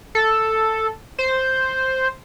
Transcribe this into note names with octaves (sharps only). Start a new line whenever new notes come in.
A4
C5